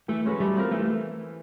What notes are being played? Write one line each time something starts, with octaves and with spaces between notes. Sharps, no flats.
E3 A3
G#3 C#4 F#4 B4
G3 A3
C4 F4 A#4
E3 A3